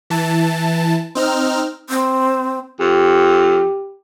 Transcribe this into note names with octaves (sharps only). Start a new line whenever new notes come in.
E3 A5
C4 D#4 F6
C4
F2 G4